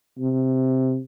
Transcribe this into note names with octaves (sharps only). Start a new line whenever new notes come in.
C3